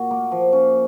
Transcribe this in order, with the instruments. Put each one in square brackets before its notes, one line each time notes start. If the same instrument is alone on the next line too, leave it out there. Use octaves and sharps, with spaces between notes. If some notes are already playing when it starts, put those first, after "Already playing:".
Already playing: [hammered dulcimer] A#2 F#4
A#3
F3
C#4